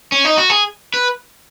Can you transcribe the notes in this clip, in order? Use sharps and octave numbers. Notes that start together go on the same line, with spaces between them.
C#4
D#4
F#4
G#4
B4